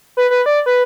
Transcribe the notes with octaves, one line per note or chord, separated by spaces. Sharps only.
B4
B4
D5
B4